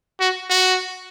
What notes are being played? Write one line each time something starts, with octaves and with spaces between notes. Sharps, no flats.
F#4
F#4